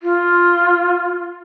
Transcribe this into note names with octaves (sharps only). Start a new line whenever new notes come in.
F4